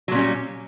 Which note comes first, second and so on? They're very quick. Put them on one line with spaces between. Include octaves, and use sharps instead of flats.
F#3 A#2 C#4 G3